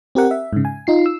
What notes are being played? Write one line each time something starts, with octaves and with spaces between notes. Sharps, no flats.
C4 G4 A#4 F#5
E5
G#2 C#3
G#5
D#4 F4 C7
E6